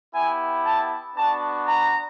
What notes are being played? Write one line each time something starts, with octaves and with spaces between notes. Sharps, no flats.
B3 E4 G4 G#5
A5
B3 D4 F#4 A5
A#5